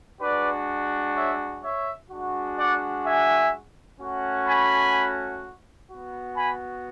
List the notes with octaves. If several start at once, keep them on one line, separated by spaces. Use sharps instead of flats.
G#3 D4 F#4 B4 D5
C#5 E5
C#5 E5
G#3 D4 F#4
D5 F#5
E5 G#5
A3 C#4 F#4
G#5 B5
B3 F#4
G#5 B5